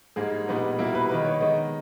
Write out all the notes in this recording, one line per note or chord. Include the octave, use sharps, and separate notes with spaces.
G#2 G3 A#3 D#4 G#4
A#2 G3 B3 D#4
B2 G3 A#3 E4
B4
D#3 A#3 D#4 B4
C#5
D#3 G#3 B3 D#5